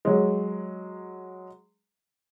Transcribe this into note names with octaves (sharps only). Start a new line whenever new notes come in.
F#3 G#3